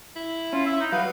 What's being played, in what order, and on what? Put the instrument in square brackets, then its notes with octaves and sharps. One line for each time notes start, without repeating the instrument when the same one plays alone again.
[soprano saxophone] E4
[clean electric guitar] C#4 [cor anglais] F4
[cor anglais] E5
D#4
[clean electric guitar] F#3 G3 F#4 [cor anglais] B4 [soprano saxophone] F5